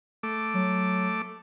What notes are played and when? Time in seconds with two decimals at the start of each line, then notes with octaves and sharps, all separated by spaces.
0.23 A3 D6
0.54 F#3